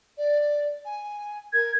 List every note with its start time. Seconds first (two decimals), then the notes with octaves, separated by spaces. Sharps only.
0.17 D5
0.85 G#5
1.53 A#4 G#6